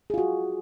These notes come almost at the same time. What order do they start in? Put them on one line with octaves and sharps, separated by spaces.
G#4 F4 F#4